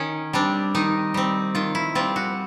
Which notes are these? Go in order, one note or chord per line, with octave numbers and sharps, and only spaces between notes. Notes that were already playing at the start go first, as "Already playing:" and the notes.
Already playing: D#3 C#4
G3 C4 D4
D#3 D#4
G3 C4
D#3 F4
E4
G3 C4 F4
F#4